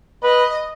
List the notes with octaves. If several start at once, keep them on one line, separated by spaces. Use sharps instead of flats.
B4 D#5